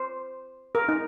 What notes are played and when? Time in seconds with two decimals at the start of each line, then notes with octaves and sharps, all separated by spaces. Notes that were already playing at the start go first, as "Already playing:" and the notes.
Already playing: C5
0.75 A#4
0.88 D#4